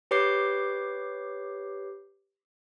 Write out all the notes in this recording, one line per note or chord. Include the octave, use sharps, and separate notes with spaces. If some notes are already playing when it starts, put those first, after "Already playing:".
G4 B4 C#5 D6 G6 C7